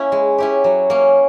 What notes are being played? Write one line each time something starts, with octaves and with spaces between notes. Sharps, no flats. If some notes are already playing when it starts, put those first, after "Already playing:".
Already playing: A#3 C#4 E4
G#3
C#4 E4 G4
F#3
A#3 C#4